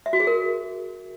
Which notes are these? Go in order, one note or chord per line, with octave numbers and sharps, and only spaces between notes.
E5
F#4
G#4
A#4